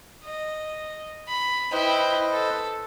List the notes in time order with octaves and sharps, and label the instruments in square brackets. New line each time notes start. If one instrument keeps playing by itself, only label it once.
[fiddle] D#5
B5
[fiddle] E4 G5 [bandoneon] B4 C5 D#5
[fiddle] A4